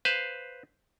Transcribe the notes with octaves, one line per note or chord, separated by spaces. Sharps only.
B4 C5 F5